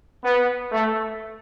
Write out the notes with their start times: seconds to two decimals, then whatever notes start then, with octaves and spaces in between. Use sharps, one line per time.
0.24 B3
0.71 A3